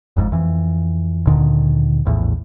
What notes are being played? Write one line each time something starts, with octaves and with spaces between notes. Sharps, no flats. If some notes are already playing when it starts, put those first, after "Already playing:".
F#1 F2 G#2
F2 E3
D2 A#2 D3 D#3
A#1 E2 A2